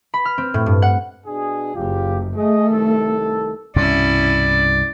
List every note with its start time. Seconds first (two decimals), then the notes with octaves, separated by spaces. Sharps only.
0.14 B5
0.25 F6
0.38 C4
0.54 A2
0.66 G2
0.82 F#5
1.27 B2 D4 G#4
1.76 F#1 C#3 F4 G4
2.36 A3 G#4 D#5
2.69 C2 D#3 A4
3.76 C2 G2 B2 C#4 E4 D5